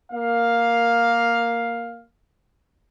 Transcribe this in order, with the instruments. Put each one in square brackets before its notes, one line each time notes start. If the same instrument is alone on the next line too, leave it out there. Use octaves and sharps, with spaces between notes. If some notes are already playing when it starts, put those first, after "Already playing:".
[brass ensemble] A#3 F5